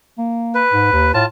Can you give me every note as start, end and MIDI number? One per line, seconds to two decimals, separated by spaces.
0.18 0.62 58
0.55 1.12 71
0.73 0.88 44
0.93 1.12 39
1.14 1.25 45
1.14 1.26 65
1.14 1.26 81